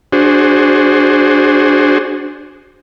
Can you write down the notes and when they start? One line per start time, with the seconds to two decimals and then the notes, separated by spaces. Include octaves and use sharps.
0.13 D4 F#4 G#4 C5